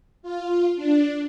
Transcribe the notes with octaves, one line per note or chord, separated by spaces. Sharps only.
F4
D4